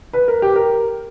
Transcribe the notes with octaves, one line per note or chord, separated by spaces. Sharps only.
B4
A#4
G4
A#4